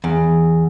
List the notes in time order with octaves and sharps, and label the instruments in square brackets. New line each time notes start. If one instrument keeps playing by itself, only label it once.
[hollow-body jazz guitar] E2